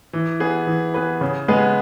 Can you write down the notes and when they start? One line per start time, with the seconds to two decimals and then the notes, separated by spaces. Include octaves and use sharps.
0.13 E3
0.40 B3 G#4 B4
0.67 E3
0.94 B3 G#4 B4
1.21 C#3
1.48 G#3 B3 G#4 B4